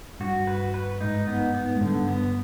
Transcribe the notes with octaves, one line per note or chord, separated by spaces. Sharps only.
G2 F#4
B4
B4
G#2 D#4
B3
B3
G#2
G2 D3
B3